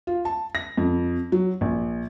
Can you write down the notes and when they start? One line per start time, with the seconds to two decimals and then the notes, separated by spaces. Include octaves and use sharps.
0.07 F4
0.25 A5
0.55 A#6
0.77 F2
1.32 F#3
1.61 A#1